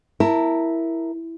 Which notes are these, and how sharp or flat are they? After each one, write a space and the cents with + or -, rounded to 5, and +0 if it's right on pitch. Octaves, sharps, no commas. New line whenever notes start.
E4 +0 A#4 +0 A5 +20